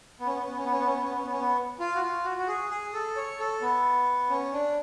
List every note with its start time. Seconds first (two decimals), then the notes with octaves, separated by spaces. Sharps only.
0.20 B3
0.27 C#4
0.35 B3
0.42 C#4
0.50 B3
0.57 C#4
0.65 B3
0.72 C#4
0.80 B3
0.87 C#4
0.95 B3
1.03 C#4
1.10 B3
1.18 C#4
1.25 B3
1.32 C#4
1.40 B3
1.80 F4
1.95 F#4
2.02 F4
2.24 F#4
2.37 F#4
2.48 G#4
2.70 G#4
2.94 A4
3.16 C#5
3.39 A4
3.62 B3
4.30 C#4
4.53 D4